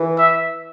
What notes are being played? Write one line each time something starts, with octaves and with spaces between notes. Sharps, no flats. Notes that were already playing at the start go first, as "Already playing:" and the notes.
Already playing: E3
E5